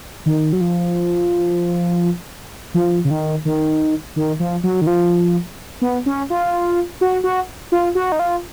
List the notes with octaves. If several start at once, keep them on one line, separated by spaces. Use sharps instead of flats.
D#3
F#3
F3
F3
C#3
D#3
D#3
D#3
F3
F#3
D#3
F3
B3
C#4
F4
F#4
F#4
F4
F#4
D#4
F4